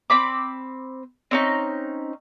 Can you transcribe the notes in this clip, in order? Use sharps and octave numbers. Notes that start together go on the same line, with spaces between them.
C4 B5 D6
C4 C#4 D#4